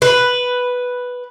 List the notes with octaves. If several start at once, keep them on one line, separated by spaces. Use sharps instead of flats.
B4